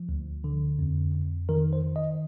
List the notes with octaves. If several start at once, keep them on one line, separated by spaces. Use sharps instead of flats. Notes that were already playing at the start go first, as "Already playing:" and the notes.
Already playing: F3
D2
D3
F2
F2
D#3 A#4
C5
D#3
D#5